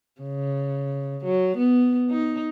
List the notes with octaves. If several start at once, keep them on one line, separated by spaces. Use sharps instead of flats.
C#3
F#3
B3
D#4